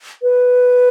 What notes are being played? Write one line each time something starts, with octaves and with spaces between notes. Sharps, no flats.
B4